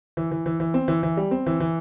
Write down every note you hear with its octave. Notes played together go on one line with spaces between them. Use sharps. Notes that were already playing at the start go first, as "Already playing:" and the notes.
E3
E3
E3
E3
C4
E3
E3
G3
C4
E3
E3